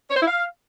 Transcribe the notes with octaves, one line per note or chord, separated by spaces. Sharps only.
C#5
C5
E4
F5